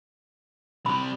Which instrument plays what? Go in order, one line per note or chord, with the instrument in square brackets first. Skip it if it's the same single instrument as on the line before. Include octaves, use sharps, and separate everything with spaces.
[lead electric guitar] C3 G3 [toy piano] B5